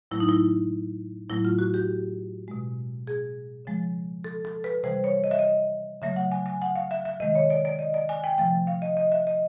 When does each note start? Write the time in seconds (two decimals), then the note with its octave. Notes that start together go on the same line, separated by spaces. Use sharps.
0.11 A2 F#3 A3 E4
0.20 D#4
0.29 E4
1.29 A2 F#3 A3 E4
1.45 F4
1.59 F#4
1.74 G4
2.48 B2 G#3
3.07 G#4
3.65 C#3 F3 G#3
4.24 A4
4.45 A4
4.64 B4
4.83 C3 E3 G3 C5
5.04 C#5
5.24 D#5
5.31 E5
5.39 D#5
6.02 C#3 F#3 A3 E5
6.16 F#5
6.32 G#5
6.46 G#5
6.62 F#5
6.76 F5
6.91 E5
7.05 E5
7.20 C3 D#3 G#3 D#5
7.35 C#5
7.50 D5
7.65 D5
7.79 D#5
7.94 D5
8.09 G#5
8.24 G5
8.38 C3 F3 A3 G5
8.67 F5
8.82 D#5
8.97 D#5
9.12 E5
9.27 D#5